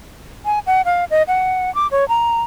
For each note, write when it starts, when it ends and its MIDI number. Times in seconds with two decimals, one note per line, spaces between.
0.45 0.59 80
0.67 0.82 78
0.85 1.05 77
1.11 1.23 75
1.28 1.73 78
1.75 1.87 86
1.91 2.07 73
2.09 2.42 82